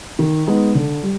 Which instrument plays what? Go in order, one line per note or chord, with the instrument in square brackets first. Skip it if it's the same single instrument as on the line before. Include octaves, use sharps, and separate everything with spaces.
[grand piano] D#3
G#3 B3 D#4
D3
G3